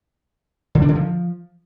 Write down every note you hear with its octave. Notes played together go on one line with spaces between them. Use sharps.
D3
D4
D3
F3